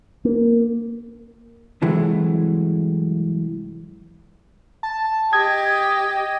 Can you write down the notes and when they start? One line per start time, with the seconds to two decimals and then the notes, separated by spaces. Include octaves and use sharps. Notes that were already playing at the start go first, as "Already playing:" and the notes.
0.25 A#3
1.82 G2 C3 E3 F#3 G#3 A3
4.83 A5
5.33 G4 D#5 G#6